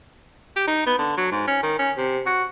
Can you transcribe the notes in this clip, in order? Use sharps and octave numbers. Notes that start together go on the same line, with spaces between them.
G4
D#4
B3
D3
F#3
G#2
C#4
D#3
C#4
C3
F#4